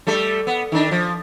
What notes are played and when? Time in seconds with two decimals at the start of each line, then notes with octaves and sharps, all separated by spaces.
0.07 G3 A3 A4
0.47 B3
0.72 D#3 D4
0.91 F3